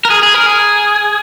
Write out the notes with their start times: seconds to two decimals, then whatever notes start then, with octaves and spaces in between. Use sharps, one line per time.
0.05 A#4
0.10 G#4
0.23 G#4
0.34 A#4
0.46 G#4